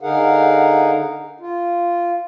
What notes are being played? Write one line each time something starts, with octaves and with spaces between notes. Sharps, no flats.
D3 D#4 G#4 A#4 F5 F#5
F4